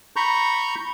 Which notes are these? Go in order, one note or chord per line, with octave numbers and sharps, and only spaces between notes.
A#5 B5 C#6 G6